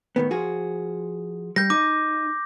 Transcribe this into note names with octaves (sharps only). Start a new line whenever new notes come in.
A2 D#3 B3
F3 F#4 G#4
G3 G6 A#6
D#4 D6